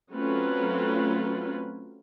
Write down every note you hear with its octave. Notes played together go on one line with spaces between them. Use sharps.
F#3 A3 C4 C#4 F4 B4